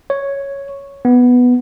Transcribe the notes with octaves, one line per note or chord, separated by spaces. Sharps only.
C#5
B3